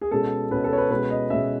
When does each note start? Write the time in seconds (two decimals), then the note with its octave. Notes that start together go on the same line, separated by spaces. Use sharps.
0.01 G#4
0.11 B2 G#3 C#4 A4
0.51 B2 G#3 C#4 B4
0.64 A4
0.73 C#5
0.78 B4
0.90 B2 G#3 C#4 B4
1.10 D#5
1.30 B2 G#3 C#4 E5